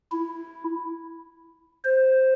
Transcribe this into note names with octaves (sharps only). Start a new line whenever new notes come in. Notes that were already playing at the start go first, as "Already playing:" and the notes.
E4
C5